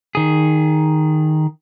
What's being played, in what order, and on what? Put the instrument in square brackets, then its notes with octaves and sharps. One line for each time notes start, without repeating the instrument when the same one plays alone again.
[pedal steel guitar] D#3 G#4